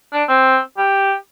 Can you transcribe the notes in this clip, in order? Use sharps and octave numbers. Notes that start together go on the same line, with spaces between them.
D4
C4
G4